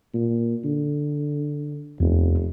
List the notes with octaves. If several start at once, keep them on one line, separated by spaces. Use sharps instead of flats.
A#2
D3
F1 E2